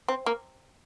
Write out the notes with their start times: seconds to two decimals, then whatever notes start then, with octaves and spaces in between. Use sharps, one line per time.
0.08 C4
0.26 A#3